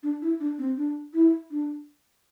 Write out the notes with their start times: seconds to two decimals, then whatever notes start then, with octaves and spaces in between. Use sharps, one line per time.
0.03 D4
0.22 E4
0.40 D4
0.59 C4
0.77 D4
1.14 E4
1.51 D4